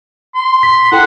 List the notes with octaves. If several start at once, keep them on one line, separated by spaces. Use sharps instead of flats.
C6
B6
E4 A4 F#5 G5